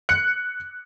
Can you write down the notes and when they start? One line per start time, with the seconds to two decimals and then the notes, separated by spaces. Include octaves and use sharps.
0.09 F#6 C#7